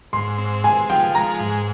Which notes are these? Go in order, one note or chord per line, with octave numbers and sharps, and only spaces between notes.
G#2 C6
C4
G#3 G#5
F3 G5
G#3 A#5
G#2